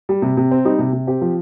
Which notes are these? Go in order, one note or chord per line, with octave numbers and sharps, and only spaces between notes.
G3
C3
C3
C4
G3 D#4
C3
C3
C4 G4
F3